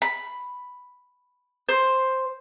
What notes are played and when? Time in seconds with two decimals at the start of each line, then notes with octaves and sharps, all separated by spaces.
0.02 B5
1.69 C5